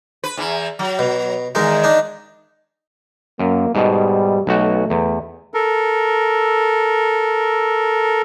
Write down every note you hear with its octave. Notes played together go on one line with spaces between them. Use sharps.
B4
E2 E3
F#3
B2
E2 D#3 G#3 D#4
D4 D#4
F#2 A#3
G#2 B2 G3
B1 A3 F#4
E2
A4 A#4